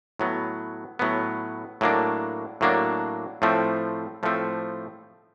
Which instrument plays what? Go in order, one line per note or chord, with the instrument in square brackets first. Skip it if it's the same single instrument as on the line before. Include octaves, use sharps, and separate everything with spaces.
[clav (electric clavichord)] A2 F#3 B3
A2 F#3 B3
A2 F#3 A#3 D4
A2 F#3 A#3 D4
A2 F3 A3 C4
A2 F3 A3 C4